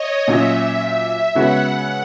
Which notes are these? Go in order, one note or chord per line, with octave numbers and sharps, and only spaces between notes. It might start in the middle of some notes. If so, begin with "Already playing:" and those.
Already playing: C#5 D#5
A#2 F#3 C#4 E5
C#3 G#3 B3 F#4 F#5